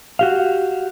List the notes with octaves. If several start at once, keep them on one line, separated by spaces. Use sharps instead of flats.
F#4 G4 F5